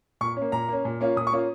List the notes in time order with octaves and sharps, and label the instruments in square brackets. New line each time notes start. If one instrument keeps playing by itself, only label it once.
[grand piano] A#2 C#6
A#3 C#4
A#2 A#5
A#3 C#4
A#2
A#3 C#4 F4
A#2 D#6
C#6
A#3 C#4 F4